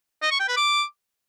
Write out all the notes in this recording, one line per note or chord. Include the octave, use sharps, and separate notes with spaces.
D#5
C#6
G5
B4
D6